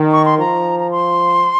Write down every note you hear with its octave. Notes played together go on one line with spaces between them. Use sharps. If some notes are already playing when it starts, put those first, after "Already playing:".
Already playing: D#3
C#6
C6
F3 A#5
A#5
C6